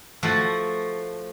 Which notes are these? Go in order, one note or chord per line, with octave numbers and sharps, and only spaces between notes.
F3 A3 F#4